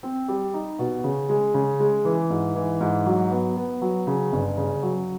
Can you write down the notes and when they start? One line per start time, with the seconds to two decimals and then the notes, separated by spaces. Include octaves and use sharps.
0.03 C4
0.28 G3
0.54 D#4
0.79 B2
1.04 C#3
1.29 G#3
1.54 C#3
1.80 G#3
2.05 E3
2.30 G#2
2.56 E3
2.80 G#2
3.06 F#3
3.31 B3
3.57 B3
3.82 F#3
4.07 C#3
4.33 G1
4.57 C#3
4.83 F#3